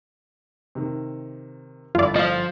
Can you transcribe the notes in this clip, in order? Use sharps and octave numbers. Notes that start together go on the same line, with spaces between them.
C3 D#3
G1 D4 E4 F4 D5
F3 D#5 F5